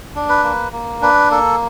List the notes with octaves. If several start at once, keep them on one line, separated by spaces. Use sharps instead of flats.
D4
B4
A#3
A#3
D4 B4
A#3 A4